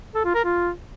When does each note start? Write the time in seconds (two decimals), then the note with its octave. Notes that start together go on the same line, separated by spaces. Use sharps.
0.15 A4
0.25 F4
0.35 A#4
0.44 F4